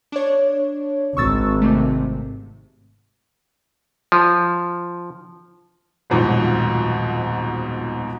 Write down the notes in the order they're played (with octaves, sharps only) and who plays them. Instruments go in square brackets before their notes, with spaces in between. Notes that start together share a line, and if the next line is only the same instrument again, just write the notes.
[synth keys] D4 C#5
[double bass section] G#1 [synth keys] C#6 E6 A6
[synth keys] C3 A3
[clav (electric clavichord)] F3
[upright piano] D#1 B1 F2 G#2 B2